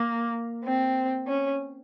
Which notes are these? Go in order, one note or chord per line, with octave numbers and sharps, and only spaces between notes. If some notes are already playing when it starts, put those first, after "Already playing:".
Already playing: A#3
C4
C#4